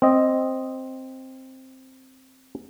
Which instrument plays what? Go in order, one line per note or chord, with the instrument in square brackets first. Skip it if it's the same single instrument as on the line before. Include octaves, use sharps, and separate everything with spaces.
[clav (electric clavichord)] C4 D#5